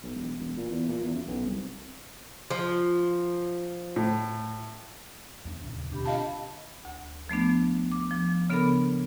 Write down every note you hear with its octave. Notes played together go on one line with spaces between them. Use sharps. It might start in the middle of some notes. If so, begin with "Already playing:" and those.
B1
E1
E1
A#2
E2
A#2
E2
F#2
B1
C2
F3
A2
E2 A3 D4
D#2 A#2 C#3
B2 D3 C4 D4 G4 B5
F4 D#5 F5 A5
D2
F3 A3 B3 D4
D6
F3
C#3 B3 D4 A4 A#4 B5